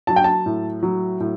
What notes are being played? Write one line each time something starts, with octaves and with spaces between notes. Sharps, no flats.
F#3 A5
G5
A5
A2
F#3
A2